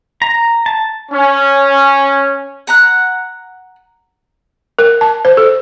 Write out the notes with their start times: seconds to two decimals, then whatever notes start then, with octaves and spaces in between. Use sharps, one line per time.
0.22 A#5
0.66 A5
1.12 C#4
2.67 F#5 A#5 F#6
4.79 A#4
5.01 A5
5.25 C5
5.37 A4